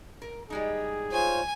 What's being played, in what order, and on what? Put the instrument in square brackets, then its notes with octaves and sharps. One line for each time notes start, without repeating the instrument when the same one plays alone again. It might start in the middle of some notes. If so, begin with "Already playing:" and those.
[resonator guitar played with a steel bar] A#4
[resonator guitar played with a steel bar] G3 G#3 D#4 [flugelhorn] G#4
[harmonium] F4 C5 C#5 [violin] G#5